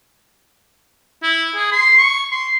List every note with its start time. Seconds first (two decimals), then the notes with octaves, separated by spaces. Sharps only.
1.23 E4
1.56 G#4
1.72 C6
1.98 C#6
2.32 C6